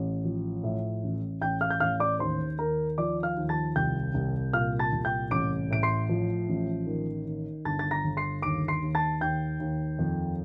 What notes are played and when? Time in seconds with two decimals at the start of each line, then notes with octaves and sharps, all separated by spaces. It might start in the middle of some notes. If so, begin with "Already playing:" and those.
Already playing: A1
0.25 F3
0.63 A2
1.03 A1
1.41 A1 G5 G6
1.61 F5 F6
1.70 G6
1.80 A1 F5 F6
2.00 D5 D6
2.19 D#2 C5 C6
2.59 D#2 A#4 A#5
2.98 F3 D5 D6
3.23 F5 F6
3.36 D#2
3.49 A5 A6
3.76 C2 G5 G6
4.14 C2
4.53 A#2 F5 F6
4.79 A5 A6
4.92 C2
5.05 G5 G6
5.31 A1 D6 D7
5.70 A2 D7
5.83 C6 C7
6.09 F3
6.48 A1
6.87 D#3
7.26 D#3
7.65 G1 A5 A6
7.79 A6
7.91 A#5 A#6
8.04 G1
8.17 C6 C7
8.42 D#2 D6 D7
8.68 C6 C7
8.82 D#2
8.95 A5 A6
9.21 D#2 G5 G6
9.60 D#2
9.99 F2